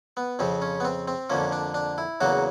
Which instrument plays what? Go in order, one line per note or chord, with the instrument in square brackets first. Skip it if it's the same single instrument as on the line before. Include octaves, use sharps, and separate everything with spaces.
[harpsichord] B3
F2 C#3 F3 C4
C#4
B3
C4
C4
F2 D3 F3 A#3 C#4
D4
D4
E4
E2 C#3 F#3 A#3 F#4